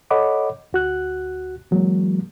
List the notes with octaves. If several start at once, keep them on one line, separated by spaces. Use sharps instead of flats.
A4 C#5 D#5 F#5 B5 D6
D2 F#4 F#6
E3 F#3 G#3 A#3